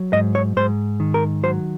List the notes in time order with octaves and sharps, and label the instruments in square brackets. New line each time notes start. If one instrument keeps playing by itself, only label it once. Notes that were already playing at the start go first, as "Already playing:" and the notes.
Already playing: [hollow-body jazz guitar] F#3
G#2 D#5
C#5
G#2 C5
D#3
A#4
F#3 C5